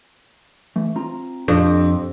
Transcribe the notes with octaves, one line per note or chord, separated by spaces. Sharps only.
E3 A3
C4 F4 A#5
F2 D4 G4